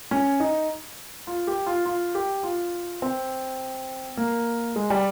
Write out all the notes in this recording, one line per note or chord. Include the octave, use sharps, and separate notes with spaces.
C#4
D#4
F4
G4
F4
F4
G4
F4
C4
A#3
G#3
G3